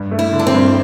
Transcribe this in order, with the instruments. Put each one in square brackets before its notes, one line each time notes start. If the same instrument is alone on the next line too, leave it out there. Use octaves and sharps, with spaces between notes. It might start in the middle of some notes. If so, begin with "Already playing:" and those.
Already playing: [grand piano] G2
A3
[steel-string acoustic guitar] E4
[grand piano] D3
[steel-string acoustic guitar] D4
C4
[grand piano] G2